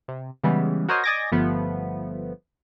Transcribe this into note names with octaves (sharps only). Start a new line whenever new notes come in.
C3
C#3 E3 G3 G#3 B3
F#4 A#4 C5 C#5 D#5
D5 D#5 G#5 D6 G#6 A#6
G1 F3 A3 B3